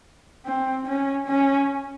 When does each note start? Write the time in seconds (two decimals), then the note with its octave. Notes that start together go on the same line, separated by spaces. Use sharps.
0.46 C4
0.86 C#4
1.27 C#4